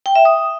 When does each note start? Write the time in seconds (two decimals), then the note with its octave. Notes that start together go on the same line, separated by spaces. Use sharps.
0.06 G5
0.16 E5
0.25 D#6